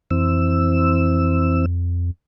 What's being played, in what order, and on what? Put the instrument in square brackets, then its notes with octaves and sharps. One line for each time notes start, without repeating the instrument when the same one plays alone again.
[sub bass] F2 [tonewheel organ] E3 C4 E6